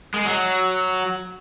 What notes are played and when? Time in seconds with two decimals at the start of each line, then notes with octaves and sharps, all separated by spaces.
0.14 G#3
0.25 F#3